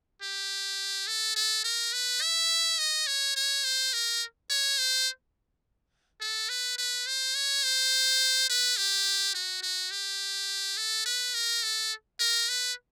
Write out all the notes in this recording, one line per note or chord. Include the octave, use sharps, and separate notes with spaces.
G4
A4
A4
A#4
B4
E5
D#5
C#5
C#5
C5
A#4
C#5
C5
A4
B4
B4
C5
C#5
C5
B4
G4
F#4
F#4
G4
A4
B4
A#4
A4
A#4
B4